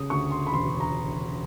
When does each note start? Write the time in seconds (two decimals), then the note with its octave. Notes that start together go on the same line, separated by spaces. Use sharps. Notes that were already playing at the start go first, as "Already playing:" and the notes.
Already playing: C#3 D#6
0.10 D2 C#6
0.31 C6
0.47 B5
0.53 E1 C6
0.80 A#5